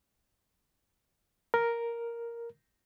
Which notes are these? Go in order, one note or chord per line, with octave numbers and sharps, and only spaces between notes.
A#4